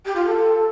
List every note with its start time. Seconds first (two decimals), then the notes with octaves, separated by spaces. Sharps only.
0.05 G4
0.15 F4
0.25 A4